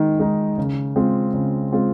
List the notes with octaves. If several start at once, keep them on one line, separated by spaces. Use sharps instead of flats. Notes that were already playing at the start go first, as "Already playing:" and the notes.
Already playing: D#3 G#3 D#4
G#3 D#4
C#3
G#3 C4 F4
C#3
G#3 C4 F4